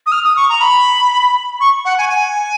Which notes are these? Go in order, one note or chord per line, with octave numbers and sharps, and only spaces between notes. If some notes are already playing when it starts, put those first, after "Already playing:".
D#6
F6
D#6
C#6
A#5
B5
C#6
F#5
G#5
G#5